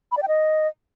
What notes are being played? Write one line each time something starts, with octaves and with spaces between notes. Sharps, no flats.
B5
D5
G5
D#5